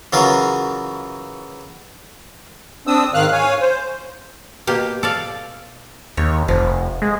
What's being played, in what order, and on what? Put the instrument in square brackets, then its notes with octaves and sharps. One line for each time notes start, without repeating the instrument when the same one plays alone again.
[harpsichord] C#3 E3 F#3 F4 A#4
[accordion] C4 D4 D#6 E6
G#2 D#3 F5 F6 F#6
C#5 F5 G#5
C5
[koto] B2 A#3 G4
A4 D5 F5
[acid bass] D#2 [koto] C#5
[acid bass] F1 [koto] F3
[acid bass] G#3